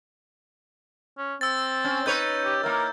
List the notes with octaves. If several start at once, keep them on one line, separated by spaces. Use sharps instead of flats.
C#4
C4 E6 A6
C#4
D#4 B4 C#5 G6
G4
A#3 E4 A#4